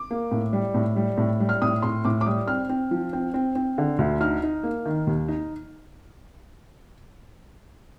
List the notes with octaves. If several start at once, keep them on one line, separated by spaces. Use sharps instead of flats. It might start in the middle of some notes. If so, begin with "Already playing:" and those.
Already playing: D6
A#3
A2
G3
A2
G3
A2
G3
F6
A2 D#6
A2 C6
A2 D6
D6
G3 D#6
C4 F6
C4
F3
C4
C4
C4
D3
D2
D#4 F6
D#4
A#3
D#3
D#2
D#4